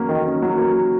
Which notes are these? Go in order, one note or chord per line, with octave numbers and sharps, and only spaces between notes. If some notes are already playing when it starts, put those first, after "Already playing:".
Already playing: F#3 A#3 C#4
D#3
C#4
F#3
A#3